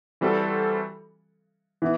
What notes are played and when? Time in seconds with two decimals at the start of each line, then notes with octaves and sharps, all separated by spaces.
0.21 E3 G3 C4 F#4 A4
1.82 E3 B3